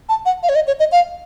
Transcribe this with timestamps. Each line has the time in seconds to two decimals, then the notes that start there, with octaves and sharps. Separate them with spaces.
0.09 A5
0.26 F#5
0.43 F5
0.49 C#5
0.55 D#5
0.67 C#5
0.80 D#5
0.92 F5